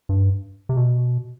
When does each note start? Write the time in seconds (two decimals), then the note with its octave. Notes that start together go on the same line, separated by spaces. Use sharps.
0.09 G2
0.69 C3
0.77 B2